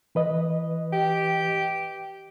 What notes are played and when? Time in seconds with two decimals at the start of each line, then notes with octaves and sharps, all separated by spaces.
0.15 E3 B4 D#5
0.93 G4